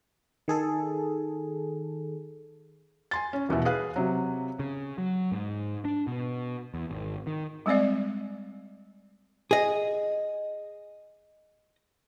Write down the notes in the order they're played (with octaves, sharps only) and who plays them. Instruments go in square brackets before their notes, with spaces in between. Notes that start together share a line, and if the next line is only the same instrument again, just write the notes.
[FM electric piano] D#3 G#4 A4
[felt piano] G#5 C6 A6
C#4
D#1 E2 B2 E5
G#4 B4 F5 F#6
C3 F#3
[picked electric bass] C#3
F#3
G#2
D4
B2
E2
G#1
D#3
[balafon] G3 G#3 C4 D5 F5
[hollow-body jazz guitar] G#4 D#5